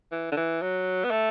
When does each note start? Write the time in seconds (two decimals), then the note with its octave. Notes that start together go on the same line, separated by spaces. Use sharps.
0.12 E3
0.32 D3
0.37 E3
0.61 F#3
1.04 B3
1.10 A3